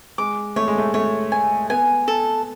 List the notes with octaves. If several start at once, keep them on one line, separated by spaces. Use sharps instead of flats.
G#3 D6
A3 C#5
G#3
A3
A3 C#5
G#5
B3 G#5
A4